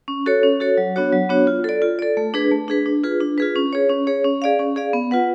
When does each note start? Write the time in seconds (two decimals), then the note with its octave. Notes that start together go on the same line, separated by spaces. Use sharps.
0.08 C#4
0.26 F#4 A4 C#5
0.43 C#4
0.60 F#4 A4 C#5
0.77 F#3
0.96 B3 D4 F#4 C#5
1.13 F#3
1.29 B3 D4 F#4 C#5
1.47 F4
1.64 A4 D5
1.82 F4
1.99 A4 D5
2.17 A3
2.34 D4 G#4 B4
2.51 A3
2.68 D4 G#4 B4
2.86 D4
3.04 F4 G#4 B4
3.20 D4
3.38 F4 G#4 B4
3.55 C#4
3.73 G#4 C#5
3.89 C#4
4.07 G#4 C#5
4.24 C#4
4.42 G#4 D5 F5
4.59 C#4
4.76 G#4 D5 F5
4.94 B3
5.11 F4 B4 F#5